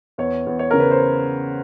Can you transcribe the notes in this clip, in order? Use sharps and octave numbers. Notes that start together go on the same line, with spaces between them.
E2 C#5
E2
C#5
C#3 A#4
B4
C5